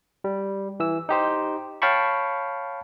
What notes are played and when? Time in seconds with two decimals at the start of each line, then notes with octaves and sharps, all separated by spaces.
0.24 G3
0.80 E3 E6
1.09 D#4 G4 C5
1.82 C#5 F5 G5 A5 B5 C#6